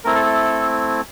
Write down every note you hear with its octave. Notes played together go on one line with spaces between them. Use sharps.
A3 C4 E4 A#4
A4
A4